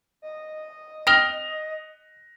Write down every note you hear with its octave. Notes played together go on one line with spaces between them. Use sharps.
D#5
G5 D#6 F6 A#6 F7 G7